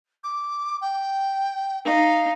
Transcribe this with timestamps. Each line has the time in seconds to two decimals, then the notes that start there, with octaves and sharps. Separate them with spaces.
0.23 D6
0.81 G5
1.85 D#4 F5